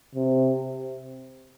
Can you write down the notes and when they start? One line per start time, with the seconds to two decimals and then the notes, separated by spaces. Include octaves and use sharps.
0.15 C3